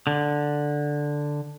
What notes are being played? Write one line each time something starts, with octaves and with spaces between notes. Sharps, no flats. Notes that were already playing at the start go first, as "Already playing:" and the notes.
D3